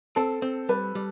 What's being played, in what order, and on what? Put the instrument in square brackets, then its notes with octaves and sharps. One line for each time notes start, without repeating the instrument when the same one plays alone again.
[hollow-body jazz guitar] C4 [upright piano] A4
[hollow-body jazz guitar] C4
[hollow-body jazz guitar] G3 [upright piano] B4
[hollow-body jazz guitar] G3